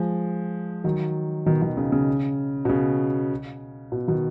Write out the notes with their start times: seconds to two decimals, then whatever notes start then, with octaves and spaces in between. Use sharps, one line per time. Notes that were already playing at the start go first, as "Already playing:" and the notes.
Already playing: F3 G#3
0.84 D#3 F#3
1.46 B2 D#3
1.62 B2 D#3
1.77 C#3
1.92 C#3
2.65 B2
2.69 C#3
3.92 B2
4.08 B2 D#3